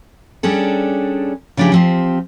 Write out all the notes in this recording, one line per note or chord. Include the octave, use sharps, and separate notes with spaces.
G3 C#4 D4 G#4 A4
C#3 F3 D4 E4 G4 G#4
F3 C4 G4